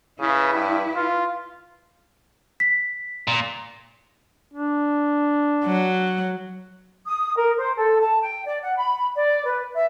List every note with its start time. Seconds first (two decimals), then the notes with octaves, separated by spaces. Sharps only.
0.20 C#3 E4 B4
0.54 G2
0.96 F4
2.60 B6
3.28 A#2
4.54 D4
5.65 F#3
7.07 D#6
7.37 A#4
7.58 C5
7.77 A4
8.00 A5
8.21 G5
8.46 D5
8.63 F#5
8.77 B5
9.16 D5
9.47 B4
9.73 E5